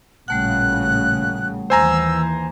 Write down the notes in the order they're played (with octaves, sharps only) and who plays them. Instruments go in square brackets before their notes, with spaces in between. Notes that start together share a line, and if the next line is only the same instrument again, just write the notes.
[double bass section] A1 A#2 C#3 [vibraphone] G3 A3 F#5 [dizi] F#6
[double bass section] D#2 E3 [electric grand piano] C5 G#5 A#5 [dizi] E6